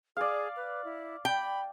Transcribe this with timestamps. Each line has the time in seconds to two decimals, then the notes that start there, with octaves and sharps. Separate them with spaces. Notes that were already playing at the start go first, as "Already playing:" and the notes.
0.17 G#4 D5 F5
0.56 B4
0.85 E4
1.25 G5 B5